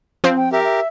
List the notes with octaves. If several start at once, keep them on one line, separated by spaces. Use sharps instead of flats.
F3 C4
G5
G4 A#4 E5
E5